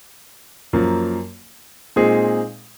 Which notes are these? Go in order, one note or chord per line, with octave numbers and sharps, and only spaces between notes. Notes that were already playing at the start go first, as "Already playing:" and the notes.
F#2 F3 A#3
A#2 G#3 C4 D#4 G#4